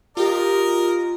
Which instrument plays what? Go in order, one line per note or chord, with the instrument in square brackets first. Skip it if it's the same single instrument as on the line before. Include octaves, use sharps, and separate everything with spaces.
[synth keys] F4 G4 [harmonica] A#4 D#5